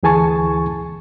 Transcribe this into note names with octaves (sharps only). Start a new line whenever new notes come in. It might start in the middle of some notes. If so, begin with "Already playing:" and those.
D2 E3 G#4 G#5 A5 C#6